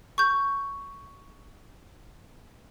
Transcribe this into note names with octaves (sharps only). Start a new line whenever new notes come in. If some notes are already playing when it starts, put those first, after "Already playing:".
C#6 G6